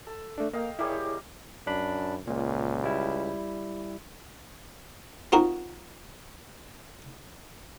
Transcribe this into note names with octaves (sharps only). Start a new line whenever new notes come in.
A4
A3 D4
A#3 D#5 F5 G5
G3 A#3 E4 G4 G#4 C#5
F#2 D4 B5
C#2 A#2
G3 E4
C4 D#4 F4 F#4 A#4